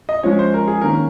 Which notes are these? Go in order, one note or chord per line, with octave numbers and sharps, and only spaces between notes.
D#5
F3 G#3 C#4 C#5
C5
A#4
G#4
D#3 A#3 C#4 A#4